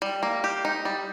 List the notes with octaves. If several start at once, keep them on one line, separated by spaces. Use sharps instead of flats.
G3
A#3
G4
D#4
G3